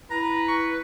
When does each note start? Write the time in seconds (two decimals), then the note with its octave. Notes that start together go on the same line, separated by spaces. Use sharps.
0.11 E4 B4 A#5
0.48 C#6